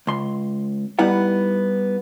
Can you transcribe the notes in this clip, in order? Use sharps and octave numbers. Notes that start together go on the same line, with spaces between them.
C#2 C6
G3 B3 D#4 E4 F#5